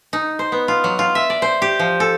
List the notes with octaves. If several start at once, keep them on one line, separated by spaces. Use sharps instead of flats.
D#4
C5
B3
F4
F#3
F4
E5
D5
C5
G4
F3
A4